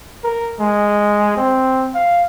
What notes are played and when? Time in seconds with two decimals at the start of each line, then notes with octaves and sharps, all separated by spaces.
0.24 A#4
0.60 G#3
1.37 C4
1.95 F5